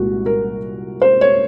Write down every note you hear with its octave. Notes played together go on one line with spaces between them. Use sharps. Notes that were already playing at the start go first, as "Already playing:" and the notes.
Already playing: C2 A#2 G#3 F#4
A#4
C5
C#5